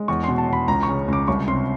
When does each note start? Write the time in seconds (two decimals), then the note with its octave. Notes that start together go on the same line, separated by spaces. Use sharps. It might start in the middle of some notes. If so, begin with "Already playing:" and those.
Already playing: G#3
0.08 E2 C#6
0.24 B2 C6
0.38 A5
0.49 E2 B5
0.68 C#2 A#5
0.83 C#6
0.88 C#3
1.08 C#2 D6
1.28 C2 C#6
1.48 C3 C6